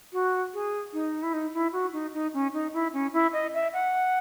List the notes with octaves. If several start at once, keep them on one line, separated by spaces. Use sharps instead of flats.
F#4
G#4
D#4
E4
D#4
E4
F#4
D#4
D#4
C#4
D#4
E4
C#4
E4
D#5
E5
F#5